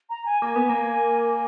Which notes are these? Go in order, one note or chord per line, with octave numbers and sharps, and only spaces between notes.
A#5
G#5
A#3 G#5
B3
A#3